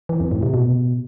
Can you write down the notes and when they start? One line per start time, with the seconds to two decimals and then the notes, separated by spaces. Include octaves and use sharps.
0.09 E3
0.20 F2
0.32 A2
0.43 C3
0.54 B2